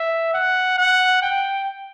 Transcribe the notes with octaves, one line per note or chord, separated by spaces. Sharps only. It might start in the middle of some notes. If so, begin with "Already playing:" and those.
Already playing: E5
F#5
F#5
G5